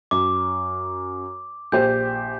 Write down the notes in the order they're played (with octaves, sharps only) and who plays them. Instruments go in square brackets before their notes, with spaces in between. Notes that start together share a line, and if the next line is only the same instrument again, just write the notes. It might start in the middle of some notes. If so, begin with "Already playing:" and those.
[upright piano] F#2 [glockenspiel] D6
[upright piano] A#1 G4 C5 [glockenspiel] G6